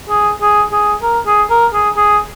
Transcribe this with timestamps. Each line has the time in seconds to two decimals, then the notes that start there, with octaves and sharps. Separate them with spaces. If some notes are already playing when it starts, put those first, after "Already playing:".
0.10 G#4
0.42 G#4
0.72 G#4
1.03 A#4
1.27 G#4
1.50 A#4
1.74 G#4
1.97 G#4